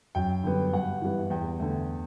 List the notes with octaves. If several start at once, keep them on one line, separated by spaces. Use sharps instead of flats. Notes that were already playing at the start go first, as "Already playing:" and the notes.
F#2 G5
D3 G3 B3
G2 F#5
E3 G3 B3
E2 G5
D3 A3